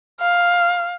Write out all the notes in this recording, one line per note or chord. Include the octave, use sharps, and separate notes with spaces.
F5